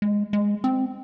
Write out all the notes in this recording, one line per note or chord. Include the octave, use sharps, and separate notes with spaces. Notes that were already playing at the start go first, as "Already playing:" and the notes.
G#3
G#3
C4